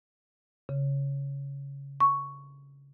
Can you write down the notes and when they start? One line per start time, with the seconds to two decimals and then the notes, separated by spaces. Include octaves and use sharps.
0.69 C#3
2.00 C#6